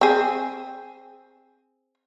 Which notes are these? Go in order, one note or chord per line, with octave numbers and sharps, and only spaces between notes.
C4 G#4